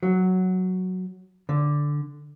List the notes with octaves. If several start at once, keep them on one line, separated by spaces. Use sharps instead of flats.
F#3
D3